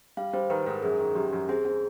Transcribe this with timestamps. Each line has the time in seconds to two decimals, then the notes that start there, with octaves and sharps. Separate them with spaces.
0.17 G3 F5
0.33 G3 C5
0.50 D#3 B4
0.66 G#2 A#4
0.83 F#2 G#4
0.99 D#3
1.15 F#2 G4
1.33 F#2
1.49 C4 G#4
1.65 C4